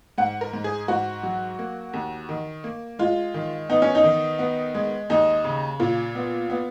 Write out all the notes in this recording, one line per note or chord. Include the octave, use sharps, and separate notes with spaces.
G#2 F#5
A#4
G#2
G#4
G#2 F#4
F#3
A#3
D#2
D#3
A#3
G#3 F4
D#3
B3 D#4
C#4
D#4
D#3
B3
G#3
D#2 D#4
C#3
A#2 F4
B3
B3